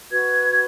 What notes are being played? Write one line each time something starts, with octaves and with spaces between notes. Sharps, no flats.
F#4 B4 G#6